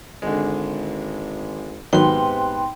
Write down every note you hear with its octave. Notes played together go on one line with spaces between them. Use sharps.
G#1 D3 G#3
G#2 C3 D#3 F#3 B3 B4 G5 C6